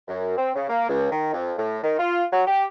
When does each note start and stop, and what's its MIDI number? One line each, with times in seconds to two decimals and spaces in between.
0.08 0.34 42
0.37 0.51 60
0.55 0.68 49
0.69 0.88 58
0.88 1.08 37
1.11 1.33 51
1.33 1.52 41
1.58 1.78 45
1.83 1.98 51
1.98 2.25 65
2.32 2.42 54
2.47 2.65 67